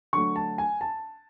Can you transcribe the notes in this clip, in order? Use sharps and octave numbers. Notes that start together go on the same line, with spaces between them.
D3 F#3 A3 C#6
A5
G#5
A5